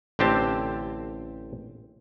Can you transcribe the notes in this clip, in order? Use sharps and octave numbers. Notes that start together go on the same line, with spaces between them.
A1 D3 C4 G4 C5 A5